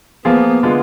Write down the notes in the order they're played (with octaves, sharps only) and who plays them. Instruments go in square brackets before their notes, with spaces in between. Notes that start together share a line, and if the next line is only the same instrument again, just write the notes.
[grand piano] F3 A#3 F4 G#4 [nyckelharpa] B3
[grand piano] D3 G#3 B3 F4